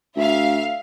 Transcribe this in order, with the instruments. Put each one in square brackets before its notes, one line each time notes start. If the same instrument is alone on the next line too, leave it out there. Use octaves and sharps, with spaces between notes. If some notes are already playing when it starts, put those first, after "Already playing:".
[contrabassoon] D2 [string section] E5 F5